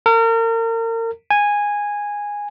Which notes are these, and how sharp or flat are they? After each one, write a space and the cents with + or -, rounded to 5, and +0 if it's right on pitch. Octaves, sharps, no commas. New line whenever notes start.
A#4 -35
G#5 -10